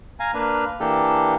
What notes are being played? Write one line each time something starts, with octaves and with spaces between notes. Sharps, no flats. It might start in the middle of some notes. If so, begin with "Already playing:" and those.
F5 G#5 A#5
A#3 D4 B4 F6
E3 A#3 D4 G4 A4